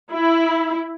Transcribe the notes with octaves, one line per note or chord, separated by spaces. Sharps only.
E4